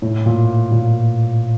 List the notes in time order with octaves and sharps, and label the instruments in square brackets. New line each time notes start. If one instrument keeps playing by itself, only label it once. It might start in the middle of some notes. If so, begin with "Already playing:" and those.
[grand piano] A2
A#2
A#2